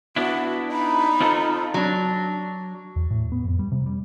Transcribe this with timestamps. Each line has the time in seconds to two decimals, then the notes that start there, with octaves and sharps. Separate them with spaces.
0.16 B3 D4 E4 F#4
0.71 D#4 B5
1.21 C4 F4 A4
1.74 F#3 D4
2.96 E2
3.11 A2
3.32 B3
3.44 F2
3.59 G3
3.72 C3
3.86 G3